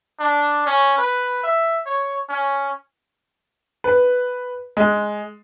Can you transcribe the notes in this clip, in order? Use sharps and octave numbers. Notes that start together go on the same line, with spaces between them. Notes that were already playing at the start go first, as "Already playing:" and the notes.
D4
C#4
B4
E5
C#5
C#4
B4
G#3